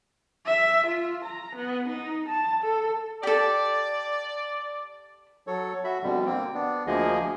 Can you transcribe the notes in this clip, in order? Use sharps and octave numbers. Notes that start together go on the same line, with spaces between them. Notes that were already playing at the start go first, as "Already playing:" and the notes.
E5
F4
A#5
B3
D#4
A5
A4
G4 A4 D5
F#3 A4 C#5
F#4 E5 B5
F2 B2 D3 G3
A#3 C4
B3 D4
D2 F3 A#3 G#4 D#5